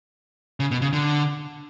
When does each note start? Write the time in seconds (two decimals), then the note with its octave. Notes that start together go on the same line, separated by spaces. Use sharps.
0.60 C#3
0.71 B2
0.82 C#3
0.93 D3